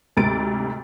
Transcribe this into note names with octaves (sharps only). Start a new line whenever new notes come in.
D2 G#2 C3 A6 D7